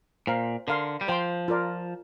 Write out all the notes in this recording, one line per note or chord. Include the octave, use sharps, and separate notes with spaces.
A#2 C5 F5 A#5
D3 A#4 F5 C6
G3
F3 C5 G5 C6
F4 A#4 D5